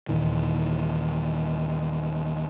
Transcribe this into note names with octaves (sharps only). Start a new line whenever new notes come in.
D#2 A#2 D#3 E3